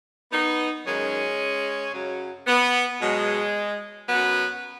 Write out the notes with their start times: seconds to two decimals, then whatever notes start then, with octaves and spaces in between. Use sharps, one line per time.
0.32 B3 D#4
0.86 F#2 D#3 F#3 G#3 C#4
1.93 F#2 C#3 F#3
2.47 B3
3.01 B2 F#3 G#3
4.09 F#2 F#3 B3